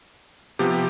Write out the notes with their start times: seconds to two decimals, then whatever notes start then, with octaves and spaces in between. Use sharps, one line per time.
0.59 C3 F3 B3 G4